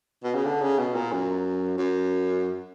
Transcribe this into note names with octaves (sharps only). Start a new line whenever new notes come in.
B2
C#3
D3
C#3
B2
A#2
F#2
F#2